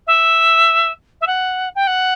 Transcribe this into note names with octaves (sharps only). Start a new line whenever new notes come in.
E5
E5
F#5
G5
F#5